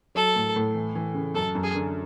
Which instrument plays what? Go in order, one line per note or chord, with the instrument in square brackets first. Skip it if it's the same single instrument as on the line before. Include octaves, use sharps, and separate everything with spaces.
[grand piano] F#3 [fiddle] A4
[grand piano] A2
A2
E3
E3
C#3
[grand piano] F#2 [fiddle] A4
[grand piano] F#2
[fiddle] G#4
[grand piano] D3